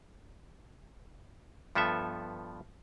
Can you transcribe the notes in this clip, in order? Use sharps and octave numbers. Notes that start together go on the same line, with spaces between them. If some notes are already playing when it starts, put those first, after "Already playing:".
G2 F3 B3 A4 E5